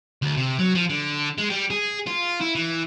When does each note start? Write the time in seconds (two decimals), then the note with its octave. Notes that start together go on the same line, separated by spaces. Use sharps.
0.22 D2
0.37 C3
0.59 F#3
0.75 F3
0.89 D3
1.38 G#3
1.50 G3
1.70 G#4
2.07 F4
2.41 E4
2.55 E3